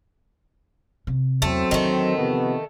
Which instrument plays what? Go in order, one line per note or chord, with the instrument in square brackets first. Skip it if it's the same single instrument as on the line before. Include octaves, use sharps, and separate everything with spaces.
[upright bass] C3
[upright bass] E2 [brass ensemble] F#3 C4 [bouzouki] A3
[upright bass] E2 D3 [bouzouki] D#3 A3
[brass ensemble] C3 F3 B3